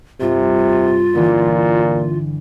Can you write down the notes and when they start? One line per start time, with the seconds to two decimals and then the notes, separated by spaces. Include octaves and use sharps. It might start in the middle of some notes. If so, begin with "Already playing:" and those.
0.21 G2 C3 F4
1.15 A#2 D3 E3